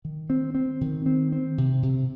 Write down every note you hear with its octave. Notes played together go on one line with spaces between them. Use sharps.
D#3
C4
C4
D#3
C4
C4
C3
C3